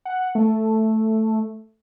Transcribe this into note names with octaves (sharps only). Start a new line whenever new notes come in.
F#5
A3